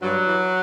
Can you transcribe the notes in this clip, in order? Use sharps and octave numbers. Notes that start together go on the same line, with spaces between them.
G2 F#3
E3